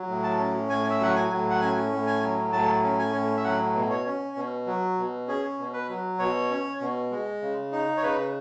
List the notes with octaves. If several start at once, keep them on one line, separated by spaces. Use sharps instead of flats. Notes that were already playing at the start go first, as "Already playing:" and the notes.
Already playing: F#3
A2
A5
C#4
A2 G#5
E5
F#3 F#5
G#5
A2
F#5
C#4 G#5
A2
G#5
F#3
A2 A5
C#4
G#5
A2
E5
F#3 F#5
B2
C#5
C#4
B2
F#3
B2
C#4 G#4
B2
B4
F#3
B2 C#5
C#4
B2
G#3
C#3
D#4
C#5
C#3 B4